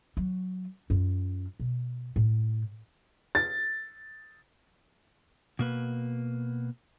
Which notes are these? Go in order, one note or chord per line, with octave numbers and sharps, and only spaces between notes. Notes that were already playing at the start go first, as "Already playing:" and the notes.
F#3
F#2 F4
B2
A2
A6
B2 A#3 B4